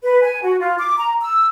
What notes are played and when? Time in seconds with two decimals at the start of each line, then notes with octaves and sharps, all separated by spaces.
0.03 B4
0.23 G#5
0.42 F#4
0.60 F4
0.79 D6
0.98 A#5
1.22 E6